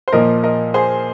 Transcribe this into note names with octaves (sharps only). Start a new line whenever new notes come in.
C5
A#2 F3 A#3 A#4 D#5
A#4 D#5
G#4 C5